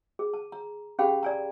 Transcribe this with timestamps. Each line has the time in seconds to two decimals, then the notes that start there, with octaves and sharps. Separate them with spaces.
0.19 G#4
0.34 A5
0.52 A#5
0.99 C#4 G4 G#4 F5 G5 B5
1.23 D5 G#5 A#5